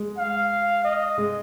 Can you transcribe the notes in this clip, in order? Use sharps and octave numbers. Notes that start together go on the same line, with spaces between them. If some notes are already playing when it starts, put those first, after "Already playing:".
Already playing: G#3
F5
D#5
G#3